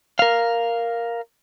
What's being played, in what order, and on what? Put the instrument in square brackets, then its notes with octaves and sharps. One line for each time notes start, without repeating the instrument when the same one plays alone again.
[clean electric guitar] A#4 F5